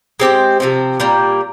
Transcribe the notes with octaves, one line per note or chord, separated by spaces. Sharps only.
G#3 C4 G4 C5
C3 F3 C4
A#2 G3 A#3